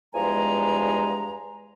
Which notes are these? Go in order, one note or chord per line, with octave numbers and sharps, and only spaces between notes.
E2 G2 F3 G#3 G#5 A#5